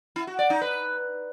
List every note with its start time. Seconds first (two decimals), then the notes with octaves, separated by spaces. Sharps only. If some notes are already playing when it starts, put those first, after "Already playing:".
0.16 E4
0.27 F#4
0.39 D5
0.50 D#4
0.61 B4